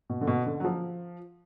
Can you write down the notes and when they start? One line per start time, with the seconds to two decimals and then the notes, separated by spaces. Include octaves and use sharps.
0.09 B2
0.21 D3
0.27 B2
0.46 D3
0.60 F#3
0.65 F3